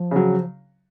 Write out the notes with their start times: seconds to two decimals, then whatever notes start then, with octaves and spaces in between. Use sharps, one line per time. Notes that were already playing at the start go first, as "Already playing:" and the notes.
Already playing: F3
0.11 C#3 F#3